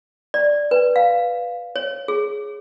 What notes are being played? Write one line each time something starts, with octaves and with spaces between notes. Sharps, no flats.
D5
B4
F5
C#5
G#4